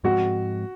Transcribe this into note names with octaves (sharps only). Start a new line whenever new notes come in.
G#2 F3 G#3 C4 F#4